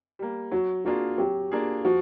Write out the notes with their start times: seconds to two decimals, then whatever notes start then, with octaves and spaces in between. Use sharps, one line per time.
0.19 G3 A#3
0.52 F#3 F#4
0.85 A#3 D4 F4 F#4 G#4
1.18 F#3 G4
1.52 A#3 D4 F4 G#4
1.85 F3 F#4